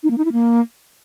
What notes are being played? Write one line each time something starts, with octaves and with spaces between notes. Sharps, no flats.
D#4
A#3
D#4
E4
A#3